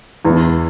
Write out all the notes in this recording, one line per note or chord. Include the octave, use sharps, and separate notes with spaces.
E2